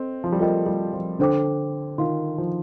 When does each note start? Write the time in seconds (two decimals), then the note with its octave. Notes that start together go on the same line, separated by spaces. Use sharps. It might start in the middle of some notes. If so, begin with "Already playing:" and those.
Already playing: C4 A4 D#5
0.24 F3
0.32 G3
0.39 A3 F4 A#4 D#5 G5
0.66 G3
0.93 F3
1.19 D3 D4 A4 C5 G5 D6
1.98 D#3 F4 A#4 F5 C6
2.38 F3